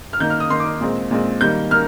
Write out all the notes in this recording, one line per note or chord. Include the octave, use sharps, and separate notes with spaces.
F6
D#3 A#3 G6
F6
D#6
D#3 A#3 C6
D6
A#2 G#3 C4
A#2 G#3 C4
D#3 G3 A#3 G6
A#3 F6